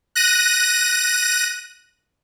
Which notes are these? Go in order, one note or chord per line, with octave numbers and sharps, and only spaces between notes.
F#6 A#6 D#7